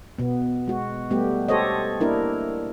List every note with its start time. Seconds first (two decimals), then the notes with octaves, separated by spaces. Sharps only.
0.18 B2 B3
0.68 G#3 F#4
1.10 G3 A3 B3 G4
1.49 G4 A4 C5 C#5 D#5
2.00 A#3 D4 E4 A#4